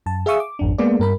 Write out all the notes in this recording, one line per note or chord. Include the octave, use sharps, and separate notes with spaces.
F#2 A5
G#4 E5 F5 C#6 D#6 E6
D6
G#1 F2 D4
G#3 A#3 B3 G#4 D5
G2 A#4 B5